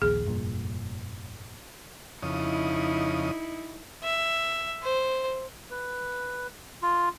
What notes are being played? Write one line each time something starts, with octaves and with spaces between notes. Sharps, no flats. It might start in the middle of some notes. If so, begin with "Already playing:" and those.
A#1 D#2 G#4
F1 G2 A#2
F2 C#3 D#4 E4 D#5
E5
C5
B4
F4